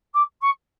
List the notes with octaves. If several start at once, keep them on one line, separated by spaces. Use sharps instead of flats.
D6
C#6